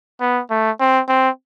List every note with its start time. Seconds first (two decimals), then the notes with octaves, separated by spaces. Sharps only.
0.21 B3
0.50 A3
0.80 C4
1.09 C4